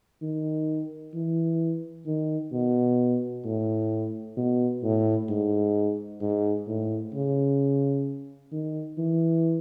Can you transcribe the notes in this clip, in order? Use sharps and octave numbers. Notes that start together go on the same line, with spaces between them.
D#3
E3
D#3
B2
A2
B2
A2
G#2
G#2
A2
C#3
D#3
E3